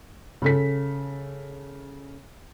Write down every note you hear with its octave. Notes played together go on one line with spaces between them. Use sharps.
C#3 A4 B6